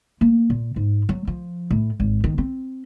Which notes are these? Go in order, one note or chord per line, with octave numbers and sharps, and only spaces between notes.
A#3
A#2
G#2
F#3
F3
A2
G#1
D#3
C4